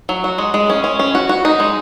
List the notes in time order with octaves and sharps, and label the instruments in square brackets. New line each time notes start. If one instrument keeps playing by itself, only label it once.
[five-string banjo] F#3
F#4
G#3
G#3
C#4
C#4
C#4
F#4
F#4
D#4
G#3